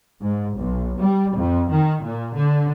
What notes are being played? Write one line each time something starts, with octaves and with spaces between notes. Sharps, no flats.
G#2
B1
G3
F2
D#3
A#2
D3